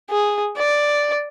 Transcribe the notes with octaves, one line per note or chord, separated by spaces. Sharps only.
G#4
D5